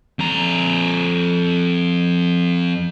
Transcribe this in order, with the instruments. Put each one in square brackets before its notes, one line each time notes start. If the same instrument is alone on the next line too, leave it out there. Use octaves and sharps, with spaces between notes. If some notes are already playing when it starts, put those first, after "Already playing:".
[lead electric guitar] F2 A#5